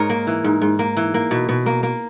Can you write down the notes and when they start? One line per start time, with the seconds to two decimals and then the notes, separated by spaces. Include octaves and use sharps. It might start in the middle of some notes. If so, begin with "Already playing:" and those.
Already playing: G#2 A#4 C#5 D#5
0.10 A#3
0.27 E3
0.44 G#2
0.61 G#2
0.79 A#3
0.97 E3
1.14 A#3
1.31 B2
1.49 B2
1.66 A#3
1.83 A#3